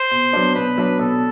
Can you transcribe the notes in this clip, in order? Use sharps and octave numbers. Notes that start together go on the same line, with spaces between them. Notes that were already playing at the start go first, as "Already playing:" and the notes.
Already playing: C5
B2
F#3 B3 D4
B2 B4
F#3 B3 D4
B2 A4